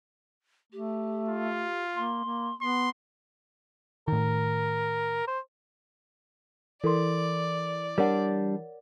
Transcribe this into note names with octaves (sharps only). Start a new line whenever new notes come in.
A3 G4
F4
A#3 C6
A#3
B3 C6
A2 D#3 A#4
C5
E3 A4 A#4 D5 C6
G3 D4 A#4 C#5 F#5